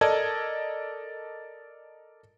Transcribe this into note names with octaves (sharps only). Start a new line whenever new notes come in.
A4 A#4 D5 D#5 A5 G#6